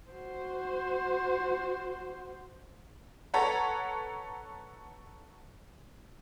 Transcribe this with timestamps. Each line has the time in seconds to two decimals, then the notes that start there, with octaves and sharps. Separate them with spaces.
0.11 F#4 C5
3.34 A4 B4 C#5 F#5 A#5